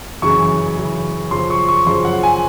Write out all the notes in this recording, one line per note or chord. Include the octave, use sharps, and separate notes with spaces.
F#2 C#3 E3 C#6
F#2 C#3 E3
F#2 C#3 F3 C6
C#6
C#6
F#2 C#3 F3 C6
F#5
G#5